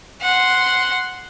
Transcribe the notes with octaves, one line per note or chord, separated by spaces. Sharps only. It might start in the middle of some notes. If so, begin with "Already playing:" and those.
F#5 C6